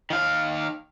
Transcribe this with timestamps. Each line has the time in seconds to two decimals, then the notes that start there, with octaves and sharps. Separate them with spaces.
0.10 D#3 F5